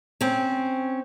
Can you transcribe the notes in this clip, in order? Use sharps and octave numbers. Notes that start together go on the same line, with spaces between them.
C4 C#4